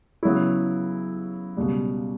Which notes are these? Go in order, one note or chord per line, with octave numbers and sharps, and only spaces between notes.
C#3 F#3 B3 E4
C#2 B2 G3